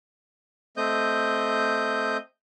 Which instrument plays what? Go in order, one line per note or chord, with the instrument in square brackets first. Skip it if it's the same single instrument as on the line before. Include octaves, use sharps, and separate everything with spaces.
[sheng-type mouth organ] A3 C4 D#5 G6